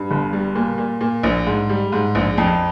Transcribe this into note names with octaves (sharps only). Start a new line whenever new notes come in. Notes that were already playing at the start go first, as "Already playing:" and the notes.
Already playing: G2
G1
G3
A#2
A#2
A#2
A#1
G#2
G3
G#2
A#1
F2